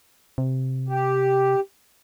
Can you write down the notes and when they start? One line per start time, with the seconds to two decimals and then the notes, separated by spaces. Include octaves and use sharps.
0.38 C3
0.89 G4